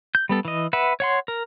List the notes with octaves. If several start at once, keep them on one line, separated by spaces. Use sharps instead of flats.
G6
G3 B3 A4
E3 D#5
B4 E5 F#5
C#5 F#5 C6
A#4